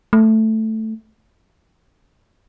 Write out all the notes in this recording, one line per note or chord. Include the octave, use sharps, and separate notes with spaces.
A3